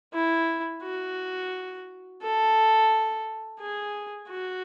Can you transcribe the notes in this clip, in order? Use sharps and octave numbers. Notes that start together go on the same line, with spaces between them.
E4
F#4
A4
G#4
F#4